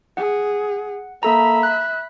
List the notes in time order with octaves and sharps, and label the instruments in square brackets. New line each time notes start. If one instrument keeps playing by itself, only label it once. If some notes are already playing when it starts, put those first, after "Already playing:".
[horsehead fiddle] G#4 [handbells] F#5
[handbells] A#3 A4 A#5 [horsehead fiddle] E5 B5
[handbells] F#6